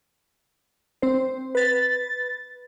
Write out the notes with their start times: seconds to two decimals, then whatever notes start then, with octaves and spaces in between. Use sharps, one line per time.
1.02 C4 C5
1.55 B4 A6